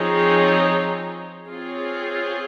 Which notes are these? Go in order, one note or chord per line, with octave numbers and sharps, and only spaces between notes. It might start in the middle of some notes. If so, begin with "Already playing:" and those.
Already playing: F3 C4 D#4 G#4 C#5
C4 F4 G#4 C#5